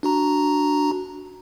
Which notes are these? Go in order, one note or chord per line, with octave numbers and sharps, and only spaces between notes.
D4 F#4 A#5